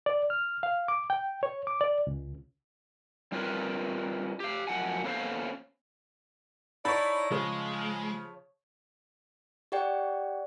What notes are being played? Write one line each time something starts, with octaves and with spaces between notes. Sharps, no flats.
D5
F6
F5
D6
G5
C#5
D6
D5
C#2
G3 C4 C#4 F4 A#4 B4
G4 F5
F#2 F3 F#5 G#5
A#3 B3 C#4 A4 C5 F5
D#4 E4 C#5 D5 A5 B5
C#3 F3 G#3
G4 C#5 D5 F#5 G5